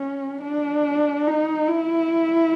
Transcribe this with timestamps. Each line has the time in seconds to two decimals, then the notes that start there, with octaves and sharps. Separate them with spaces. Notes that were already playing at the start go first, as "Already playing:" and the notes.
Already playing: C#4
0.42 D4
1.27 D#4
1.68 E4